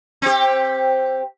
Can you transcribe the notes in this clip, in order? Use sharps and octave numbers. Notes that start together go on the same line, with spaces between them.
C4 G4